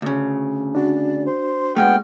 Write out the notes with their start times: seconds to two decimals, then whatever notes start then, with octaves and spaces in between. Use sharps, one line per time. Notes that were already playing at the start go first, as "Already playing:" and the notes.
0.02 D2 C#3
0.75 D4 F#4 D5
1.25 C5
1.76 A#2 G#3 A3 B3 G5 F6